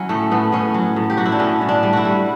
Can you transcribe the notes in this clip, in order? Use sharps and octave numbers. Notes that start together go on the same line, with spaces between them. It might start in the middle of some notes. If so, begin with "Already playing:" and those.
Already playing: F#3 C#4 E4
A2 A3
A2 B3
A2 C#4
F#3
A2
G4
F#3 F#4
E4
D4
A2 C#4
A2
D4
G3
E4 F#4
G3